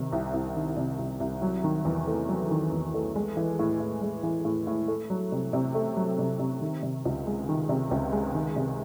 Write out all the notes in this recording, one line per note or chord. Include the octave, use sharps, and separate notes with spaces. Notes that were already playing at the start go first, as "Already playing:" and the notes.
Already playing: C3 D#3
C2
C2
D#3
C3
C2
C2
F#3
D#3
E2
A3
F#3
D#3
E2
A3
G#3
E3
A2
A2
G#3
E3
A2
A2
A3
F#3
C3
C3
A3
F#3
C3
C3
D#3
C3
C#2
G#3
D#3
C3
C#2
G#3
D#3
C3